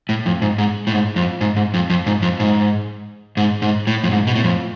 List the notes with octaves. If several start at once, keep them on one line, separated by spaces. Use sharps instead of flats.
A2
F2
G#2
G#2
A2
G#2
F2
G#2
G#2
F2
F2
G#2
F2
G#2
G#2
G#2
A2
F2
G#2
B2
A2
F2